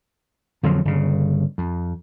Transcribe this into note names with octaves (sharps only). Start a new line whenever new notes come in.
F2 D3 F3 F#3
G1 C#3
F2